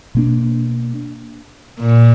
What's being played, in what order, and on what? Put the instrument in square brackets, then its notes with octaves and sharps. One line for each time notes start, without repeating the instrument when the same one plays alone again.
[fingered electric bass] B2 A#3 D4
[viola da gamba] A#2